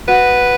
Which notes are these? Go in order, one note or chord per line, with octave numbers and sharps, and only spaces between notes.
F#4 B4